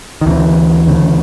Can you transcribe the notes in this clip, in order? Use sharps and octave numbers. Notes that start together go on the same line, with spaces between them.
D#3
D2 C#3 E3
D2 C#3